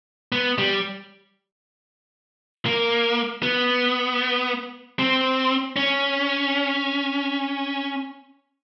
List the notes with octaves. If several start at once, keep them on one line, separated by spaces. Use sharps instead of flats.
B3
G3
A#3
B3
C4
C#4